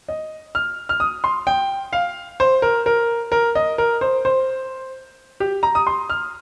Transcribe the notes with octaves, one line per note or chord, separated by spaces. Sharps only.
D#5
F6
F6
D#6
C6
G5
F5
C5
A#4
A#4
A#4
D#5
A#4
C5
C5
G4
A#5
D#6
C6
F6